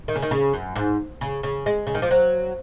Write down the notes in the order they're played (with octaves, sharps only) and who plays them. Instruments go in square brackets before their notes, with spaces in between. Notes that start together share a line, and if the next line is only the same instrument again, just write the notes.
[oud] D#3
C#3
D#3
C#3
F#2
G#2
C#3
C#3
G#3
C#3
D#3
F3
F#3